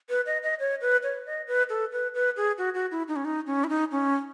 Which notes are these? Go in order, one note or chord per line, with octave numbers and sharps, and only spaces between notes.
B4
D#5
D#5
C#5
B4
C#5
D#5
B4
A4
B4
B4
G#4
F#4
F#4
E4
D#4
C#4
D#4
C#4
E4
D#4
C#4